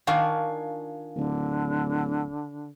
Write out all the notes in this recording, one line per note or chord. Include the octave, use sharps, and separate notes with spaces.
D#3 D4 F4 F5 G#5 C#6
D1 D3